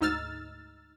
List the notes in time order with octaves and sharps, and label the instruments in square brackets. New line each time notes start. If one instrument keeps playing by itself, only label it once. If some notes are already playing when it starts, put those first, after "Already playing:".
[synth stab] D2 G#2 D#4 E6 F6 A6